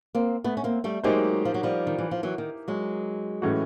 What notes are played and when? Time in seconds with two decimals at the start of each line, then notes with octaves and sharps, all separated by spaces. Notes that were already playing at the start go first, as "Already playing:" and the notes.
0.15 A#3 C4
0.44 A3 B3
0.57 C#4
0.64 A#3 C4
0.84 G3 A3
1.03 F#3 G#3 A#3 D#4 G4 C5
1.45 F3
1.54 F#3
1.63 F3 G3
1.87 D#3
1.99 E3
2.11 F3
2.23 E3 F#3
2.38 D#3
2.68 F#3 G#3
3.42 A2 E3 A3 C#4 F#4